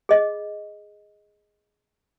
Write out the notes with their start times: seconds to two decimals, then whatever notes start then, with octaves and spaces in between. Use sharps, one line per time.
0.09 G#4 D#5